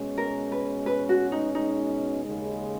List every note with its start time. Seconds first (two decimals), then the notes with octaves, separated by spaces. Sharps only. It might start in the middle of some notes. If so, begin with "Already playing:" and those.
Already playing: B2 G#3 C#4
0.18 A#4
0.52 B4
0.86 B4
1.09 F#4
1.32 D#4
1.55 D#4
2.25 D#2 C#3 G#3